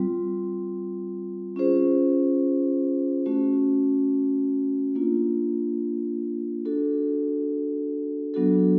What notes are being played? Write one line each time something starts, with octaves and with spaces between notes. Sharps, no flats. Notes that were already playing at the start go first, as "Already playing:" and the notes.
Already playing: G3 C4 F4
C#4 F4 G#4 C5
A3 C#4 F#4
A#3 D4 F4
D4 F#4 A4
F#3 B3 D4 F#4 A4